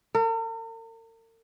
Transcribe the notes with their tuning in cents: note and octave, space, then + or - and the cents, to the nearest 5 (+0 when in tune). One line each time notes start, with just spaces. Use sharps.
A#4 -45